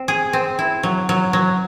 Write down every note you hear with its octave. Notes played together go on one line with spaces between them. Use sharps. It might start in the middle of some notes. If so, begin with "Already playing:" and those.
Already playing: C4
G#4
C4
E4
F#3
F#3
F#3